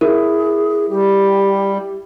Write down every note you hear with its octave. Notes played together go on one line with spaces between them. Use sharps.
E4 G#4 A#4
G3 G4